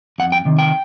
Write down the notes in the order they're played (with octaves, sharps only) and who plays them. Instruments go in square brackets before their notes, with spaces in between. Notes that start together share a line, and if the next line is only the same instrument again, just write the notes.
[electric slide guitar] F2 F#5
G5
C3 D#3
G5